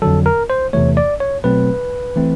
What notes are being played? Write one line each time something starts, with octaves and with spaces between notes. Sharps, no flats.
F2 D3 F#3 A4
A#4
C5
E2 C3 E3 A3 C#5
D5
C#5
B2 F#3 A3 C4 B4
E3 A3 C4